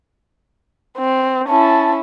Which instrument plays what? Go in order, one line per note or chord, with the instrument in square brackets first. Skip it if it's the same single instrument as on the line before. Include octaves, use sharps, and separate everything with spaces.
[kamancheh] C4
[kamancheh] C#4 E4 [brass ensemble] A5